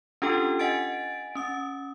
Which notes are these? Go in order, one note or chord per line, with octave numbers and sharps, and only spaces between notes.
C#4 D4 F4 G4 A4 G5
D#5 F#5 G#5 A6 D7
C#4 D#6